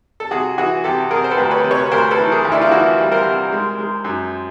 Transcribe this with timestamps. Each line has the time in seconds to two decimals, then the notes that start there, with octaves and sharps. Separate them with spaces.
0.20 A4
0.31 C3 F#4 G#4
0.58 E3 F#4 G#4
0.84 C3 G4 A4
1.11 C3 G#4 A#4
1.24 C5
1.31 A4 B4
1.38 D2
1.51 B4 C#5
1.64 C3
1.71 B4 C#5
1.92 D2 A#4 C5
2.11 A4 B4
2.19 E3
2.31 G#4 A#4
2.45 D2
2.52 D4 E4
2.61 F4
2.71 E3 E4 F#4
2.98 G3
3.12 A#4 C5
3.25 C3
3.52 G#3
3.79 G#3
4.04 F#2